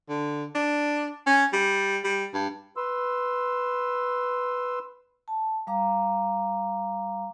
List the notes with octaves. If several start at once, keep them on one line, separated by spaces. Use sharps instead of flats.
D3
D4
C#4
G3
G3
G2
B4 C6 E6
A5
G3 F5 A#5 D6